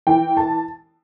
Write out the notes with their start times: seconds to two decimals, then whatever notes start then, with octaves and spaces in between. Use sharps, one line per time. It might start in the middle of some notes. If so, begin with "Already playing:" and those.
0.07 E3 G5
0.37 A5